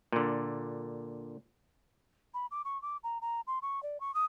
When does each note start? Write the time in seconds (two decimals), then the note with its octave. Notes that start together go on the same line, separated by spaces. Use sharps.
0.12 A#2 D3
2.34 B5
2.51 D6
2.65 C#6
2.82 D6
3.03 A#5
3.21 A#5
3.47 C6
3.62 C#6
3.83 D5
4.00 C#6
4.14 D#6